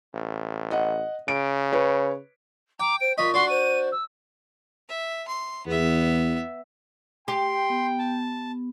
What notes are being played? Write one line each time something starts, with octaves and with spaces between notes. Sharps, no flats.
A1
D#5 F#5
C#3 D7
B4 C#5
G5 A#5 D6
C5 D7
A#2 D#5 C#6 B6
D4 F#4 C6
C5 D#7
E6
E5
C6
E2 B3 E5
G4 G5 C6
B3
A5